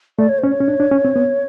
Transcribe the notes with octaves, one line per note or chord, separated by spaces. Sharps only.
A3 D5
C#5
C5
C#4
C#5
C#4
D4
D4
C#4
C4
B3